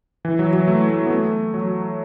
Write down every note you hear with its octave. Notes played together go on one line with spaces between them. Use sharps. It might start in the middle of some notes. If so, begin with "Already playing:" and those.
E3
F#3
F#3
A3
A3
B3
A3
F#3